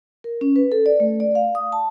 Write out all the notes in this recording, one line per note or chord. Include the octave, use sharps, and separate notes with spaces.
A#4
C#4
B4
A4
D5
A3
D5
F5
D#6
A5